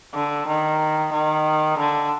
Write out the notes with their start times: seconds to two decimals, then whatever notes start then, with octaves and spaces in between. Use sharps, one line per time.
0.15 D3
0.48 D#3
1.13 D#3
1.79 D3